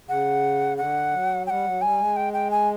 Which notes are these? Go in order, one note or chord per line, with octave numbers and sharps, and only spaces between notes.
C#3 F#5
D3 F#5
F#3
G3 F#5 G5
F#3
G3 G#5
G#3
G5
G5
G#5